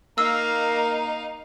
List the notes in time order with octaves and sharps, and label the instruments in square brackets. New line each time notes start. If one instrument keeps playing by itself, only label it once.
[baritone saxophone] A#3 [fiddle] D#4 F5 [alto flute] A#5 [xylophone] E6